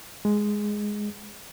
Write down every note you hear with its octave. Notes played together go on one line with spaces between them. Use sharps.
G#3